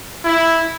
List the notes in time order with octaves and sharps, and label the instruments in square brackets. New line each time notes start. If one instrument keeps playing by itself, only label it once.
[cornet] E4